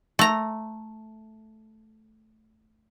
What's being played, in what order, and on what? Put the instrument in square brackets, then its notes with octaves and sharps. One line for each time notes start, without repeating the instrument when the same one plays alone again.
[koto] A3 A#5